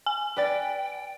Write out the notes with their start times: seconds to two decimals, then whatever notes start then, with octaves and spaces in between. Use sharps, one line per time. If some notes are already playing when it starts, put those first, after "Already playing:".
0.06 G#5
0.37 B4 D5 G5 A6